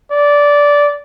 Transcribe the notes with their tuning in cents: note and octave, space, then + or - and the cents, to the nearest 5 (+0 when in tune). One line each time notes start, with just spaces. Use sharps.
D5 -15